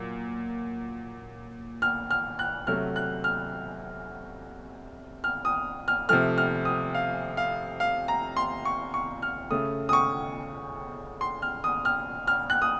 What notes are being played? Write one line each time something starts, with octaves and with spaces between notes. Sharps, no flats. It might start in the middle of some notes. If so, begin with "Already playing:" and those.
Already playing: A#2 F#3
F6
F6
F#6
C3 F#3 A3 F6
F#6
F6
F6
D#6
F6
C3 F3 A3 F6
F6
D#6
F5
F5
F5
A#5
C6
C#6
C#6
F6
C#3 A3 D#6
D#6
C#6
C6
F6
D#6
F6
F6
F#6
D#6